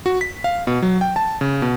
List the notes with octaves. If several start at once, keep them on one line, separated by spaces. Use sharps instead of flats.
F#4
B6
F5
B2
F#3
G5
A5
C#3
B2